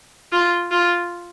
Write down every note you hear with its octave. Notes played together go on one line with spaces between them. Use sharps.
F4
F4